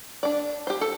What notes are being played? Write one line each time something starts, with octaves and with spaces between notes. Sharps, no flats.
D4 D5
G4 C5
A4